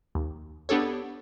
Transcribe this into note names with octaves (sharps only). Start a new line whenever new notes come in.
D#2
B3 D4 G4 A4 C#5